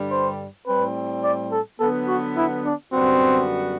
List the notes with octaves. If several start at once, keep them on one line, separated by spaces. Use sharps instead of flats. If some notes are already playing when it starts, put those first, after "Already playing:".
Already playing: G2 D3 G3
C5
A2 G3 C4 B4
D5
A4
D3 F#3 B3 A4
F#4
E4
D4
F#2 D3 G3 B3 C4 F#4